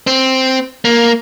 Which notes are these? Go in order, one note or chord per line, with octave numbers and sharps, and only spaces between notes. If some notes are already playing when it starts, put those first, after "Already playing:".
C4
A#3